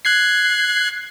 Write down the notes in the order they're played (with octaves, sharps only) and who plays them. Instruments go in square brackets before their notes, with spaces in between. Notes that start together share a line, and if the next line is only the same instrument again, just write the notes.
[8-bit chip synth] F#6 G#6 C7